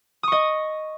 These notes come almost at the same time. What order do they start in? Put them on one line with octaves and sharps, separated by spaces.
D#6 C#6 D#5